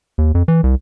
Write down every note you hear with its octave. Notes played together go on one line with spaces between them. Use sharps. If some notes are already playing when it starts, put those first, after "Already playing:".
D#2
F2
E3
C2